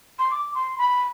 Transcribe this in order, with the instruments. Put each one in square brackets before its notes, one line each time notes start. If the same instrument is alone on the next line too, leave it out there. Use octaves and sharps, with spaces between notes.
[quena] C6
D6
C6
B5